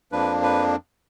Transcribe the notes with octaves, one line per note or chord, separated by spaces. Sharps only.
F2 F3 A#3 D4 B4
B4